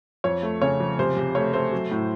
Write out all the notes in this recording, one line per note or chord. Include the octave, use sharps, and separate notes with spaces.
F2 C#5
A3
C#3 C#5
F2
C3 C5
C3
A3 C#5
A3 C5
F#3
A2